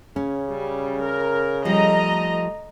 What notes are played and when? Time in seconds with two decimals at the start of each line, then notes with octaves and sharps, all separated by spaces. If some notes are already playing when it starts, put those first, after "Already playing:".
0.16 C#3 C#4
0.50 G3
1.03 A#4
1.65 F3 G3 A3 D#5 A#5